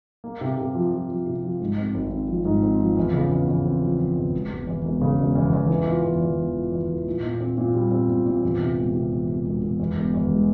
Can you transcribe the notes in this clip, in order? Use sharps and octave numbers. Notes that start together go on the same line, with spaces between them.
A#3
C3
C3
F3
F3
F3
C3
F3
G#2
C4
G#1
C4
F3
G#2
C4
F3
E2
C#3
E2
E2
C4
F3
F3
E2
E1
E1
E2
E1
C#3
E1
E2
E2
E3
F4
E2
E2
E2
F4
E2
E3
A#2
A#2
C4
A#2
G3
C4
A#2
A#2
E2
C3
E1
C3
E2
C3
E1
E1
E2
E1
E2
G#3